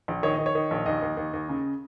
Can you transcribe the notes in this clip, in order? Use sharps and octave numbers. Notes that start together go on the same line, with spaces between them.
A#1
D#3 C#5
D#3 D#5
C#5
D#3
A#1
D#2 D#5
D#2
D#2
D#2
C#3